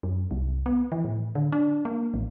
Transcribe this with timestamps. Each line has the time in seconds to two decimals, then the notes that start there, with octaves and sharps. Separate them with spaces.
0.03 F#2
0.31 C2
0.66 B3
0.92 E3
1.04 A2
1.35 D3
1.52 D4
1.85 A#3
2.14 A1